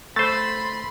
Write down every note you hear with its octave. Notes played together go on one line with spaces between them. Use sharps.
A3 C5 B5 C6 A6